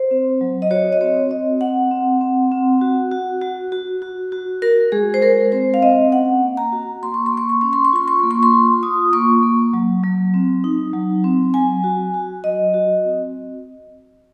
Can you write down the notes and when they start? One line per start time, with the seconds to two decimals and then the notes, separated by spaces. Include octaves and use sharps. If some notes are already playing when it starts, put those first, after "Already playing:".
Already playing: C5
0.11 C4
0.41 F#3
0.62 D#5
0.71 F#4 C#5
0.93 D#5
1.01 C4 C#5
1.31 C4 D#5
1.61 C4 F#5
1.91 C4
2.21 C4
2.52 C4
2.81 F#4
3.11 F#4
3.41 F#4
3.72 F#4
4.02 F#4
4.32 F#4
4.62 F#4 A#4
4.92 G#3 G#4
5.14 C5
5.22 G#3 A#4
5.52 C4 C5
5.74 F5
5.82 C4 D#5
6.12 C#4 F#5
6.42 A#3
6.57 A#5
6.72 F#4
7.02 A#3 C6
7.14 C#6
7.26 C6
7.32 A#3
7.37 C#6
7.49 C6
7.61 C#4 C#6
7.73 C6
7.85 C#6
7.93 F4 C6
8.08 C#6
8.19 A#3 C6
8.31 C#6
8.43 C6
8.53 F4
8.83 F4 D#6
9.13 A#3 C#6
9.43 A#3
9.73 F#3
10.04 F#3
10.34 C4
10.64 D#4
10.93 F#3
11.24 C4
11.54 F#3 G#5
11.84 F#4
12.14 F#4
12.44 F#3 D#5
12.74 F#4
13.05 C4